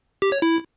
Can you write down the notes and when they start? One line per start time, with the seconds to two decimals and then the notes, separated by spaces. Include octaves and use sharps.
0.22 G4
0.32 C#5
0.42 E4